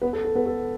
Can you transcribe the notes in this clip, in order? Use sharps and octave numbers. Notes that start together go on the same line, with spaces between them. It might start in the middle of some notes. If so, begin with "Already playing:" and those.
B3 B4
A4
A4
B3 B4
A4